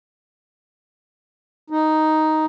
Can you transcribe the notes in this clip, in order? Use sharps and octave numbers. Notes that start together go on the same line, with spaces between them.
D#4